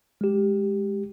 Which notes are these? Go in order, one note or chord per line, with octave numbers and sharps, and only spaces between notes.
G#3 G4